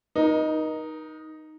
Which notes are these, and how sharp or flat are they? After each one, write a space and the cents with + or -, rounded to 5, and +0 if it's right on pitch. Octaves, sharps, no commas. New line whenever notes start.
D#4 +0 A#4 +40